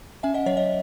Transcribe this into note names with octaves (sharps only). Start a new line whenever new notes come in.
C#4 E5 G#5
D#5 F#5
F#3 C#5 E5
D#5